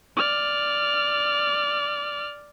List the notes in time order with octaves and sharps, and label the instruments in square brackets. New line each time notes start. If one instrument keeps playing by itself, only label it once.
[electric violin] D5 F6